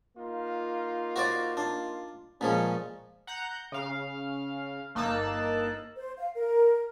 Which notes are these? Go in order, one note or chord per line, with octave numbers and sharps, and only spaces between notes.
A#3 D#4 F4
F#4 C5 D5
D4
A#2 F3 G#3 C#4
F#5 A#5 F#6 G6
C#3 F5
G1 A#3 D#4 A5 E6 F#6
C5
F5
A#4